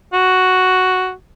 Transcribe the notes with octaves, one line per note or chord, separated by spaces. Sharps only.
F#4